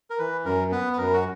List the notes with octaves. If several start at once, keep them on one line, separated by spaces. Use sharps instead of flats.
A#4
E3 B4
F#2 A#4
B3 B4
B4
F#2 A#4
F#4